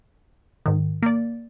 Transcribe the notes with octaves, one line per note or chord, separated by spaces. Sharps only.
G#2 D#3
A#3 D5